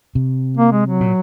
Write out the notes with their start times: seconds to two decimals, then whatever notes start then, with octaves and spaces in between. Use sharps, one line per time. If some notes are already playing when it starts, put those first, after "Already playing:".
0.15 C3
0.58 A#3
0.72 G#3
0.86 F#3
1.00 A#2